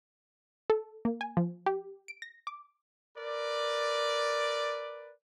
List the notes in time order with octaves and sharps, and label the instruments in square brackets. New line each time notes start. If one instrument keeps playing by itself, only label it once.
[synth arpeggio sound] A4
A#3
G#5
F3
G4
D7
A#6
D6
[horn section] A#4 B4 D5